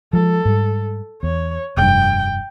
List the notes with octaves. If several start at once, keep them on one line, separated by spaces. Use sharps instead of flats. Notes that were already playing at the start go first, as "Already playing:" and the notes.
F3 G#3 A4
G#2 G3
E2 C#5
F1 G2 G5